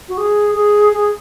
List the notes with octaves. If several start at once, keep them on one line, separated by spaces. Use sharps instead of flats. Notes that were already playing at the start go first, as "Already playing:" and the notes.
F#4
G#4
G#4
G#4